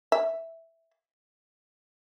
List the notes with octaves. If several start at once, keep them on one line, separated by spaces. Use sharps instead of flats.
E5